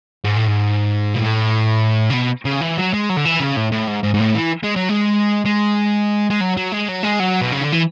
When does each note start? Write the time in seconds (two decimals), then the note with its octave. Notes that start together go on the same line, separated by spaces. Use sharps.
0.24 G#2
0.36 A2
0.47 G#2
1.14 B2
1.20 A2
2.10 C#3
2.13 B2
2.45 C#3
2.61 E3
2.78 F#3
2.94 G#3
3.09 F#3
3.16 D3
3.25 E3
3.40 C#3
3.56 A2
3.72 A2
3.87 G#2
4.03 G#2
4.14 G#2
4.20 A2
4.35 E3
4.64 G#3
4.76 F#3
4.89 G#3
5.45 G#3
6.30 G#3
6.40 F#3
6.57 F#3
6.72 G#3
6.88 F#3
7.03 G#3
7.20 F#3
7.41 B2
7.52 C#3
7.62 D3
7.73 E3